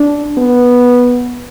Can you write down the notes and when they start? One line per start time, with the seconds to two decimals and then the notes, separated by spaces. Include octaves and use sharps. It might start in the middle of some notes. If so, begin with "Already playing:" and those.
Already playing: D4
0.38 B3